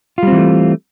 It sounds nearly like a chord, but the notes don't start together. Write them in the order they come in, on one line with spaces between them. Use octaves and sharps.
F4 G3 C4 E3 A3